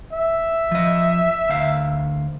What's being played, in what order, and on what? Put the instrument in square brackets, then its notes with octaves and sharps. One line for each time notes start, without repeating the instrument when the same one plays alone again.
[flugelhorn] E5
[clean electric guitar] F3 D#5
D2 F5